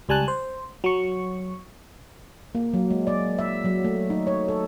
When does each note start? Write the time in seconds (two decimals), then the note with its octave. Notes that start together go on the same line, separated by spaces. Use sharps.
0.09 C#2 G3 G#5 A5 F#6
0.28 C5
0.84 F#3 C#6
2.55 A#3
2.74 F#3
2.91 G#3
3.07 D5
3.39 E5
3.65 F#3
3.84 A3
4.10 D#4
4.27 C#5
4.48 A4